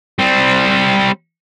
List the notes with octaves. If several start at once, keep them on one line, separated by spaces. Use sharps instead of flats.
G3 C4